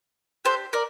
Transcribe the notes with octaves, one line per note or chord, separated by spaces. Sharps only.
D4 G4 A4 C5
A#4 D5